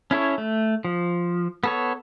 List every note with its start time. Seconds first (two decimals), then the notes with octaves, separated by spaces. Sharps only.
0.11 C#4 E4 A4 C#5
0.38 A3
0.85 F3
1.64 B3 A4 C#5